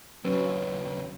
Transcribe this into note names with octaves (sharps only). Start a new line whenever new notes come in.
D#2 C#3 F#3 C#4 B4 C#5